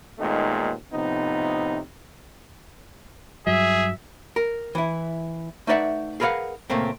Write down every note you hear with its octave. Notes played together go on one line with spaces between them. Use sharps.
D#2 A#2 G#3 A3 B3 D#4
A2 C3 F3 B3 D#4
G2 F#3 G#4 E5
A#4
E3 E4
A3 D#4 B4 D5 E5 F#5
G#4 A#4 B4 C#5 F5 F#5
C#2 A#2 A3 A#3 C4